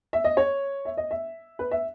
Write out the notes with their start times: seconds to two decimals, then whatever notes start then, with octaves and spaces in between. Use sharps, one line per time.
0.13 E5
0.24 D#5
0.37 C#5
0.85 E5
0.97 D#5
1.11 E5
1.59 B4
1.71 E5